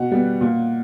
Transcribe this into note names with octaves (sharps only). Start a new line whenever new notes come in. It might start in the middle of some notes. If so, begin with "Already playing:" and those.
Already playing: B2 F#5
G3 B3
A#2